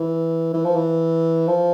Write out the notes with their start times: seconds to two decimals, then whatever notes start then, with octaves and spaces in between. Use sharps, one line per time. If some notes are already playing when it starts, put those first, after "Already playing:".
Already playing: E3
0.54 E3
0.65 F3
0.76 E3
1.48 F3